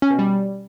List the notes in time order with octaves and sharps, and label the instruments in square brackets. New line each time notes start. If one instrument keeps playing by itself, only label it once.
[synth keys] C#4
B2
G3